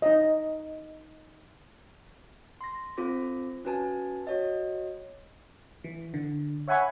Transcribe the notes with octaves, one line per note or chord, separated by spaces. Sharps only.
D#4 D#5
C6 A#6
C4 F4 A4 C5 D6 A#6
C#4 F#4 B4 G#5 A5
F#4 C#5 D#5
E3
D3
C#5 E5 F#5 G#5 B5 C#6